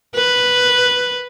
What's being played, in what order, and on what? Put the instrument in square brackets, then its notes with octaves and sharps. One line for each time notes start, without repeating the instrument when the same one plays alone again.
[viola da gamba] B4